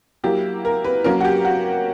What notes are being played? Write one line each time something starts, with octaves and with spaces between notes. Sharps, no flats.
F#3 A#3 E4 G4
A#4
B4
F#3 A#3 C#4 A#4
F#4
G4
F#4